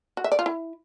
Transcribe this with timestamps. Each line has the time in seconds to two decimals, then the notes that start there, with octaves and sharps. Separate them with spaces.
0.17 F#4
0.24 E5
0.32 D5
0.39 F4
0.46 E4